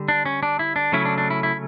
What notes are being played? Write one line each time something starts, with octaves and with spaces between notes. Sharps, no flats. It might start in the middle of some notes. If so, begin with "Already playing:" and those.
Already playing: D3 G3
D4
C#4
D4
E4
D4
C#3 F#3 A3 C#4 E4
D4
D4
E4
E4